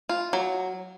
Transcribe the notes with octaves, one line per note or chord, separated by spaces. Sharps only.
F4
F#3